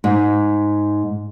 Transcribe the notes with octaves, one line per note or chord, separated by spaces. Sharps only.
G#2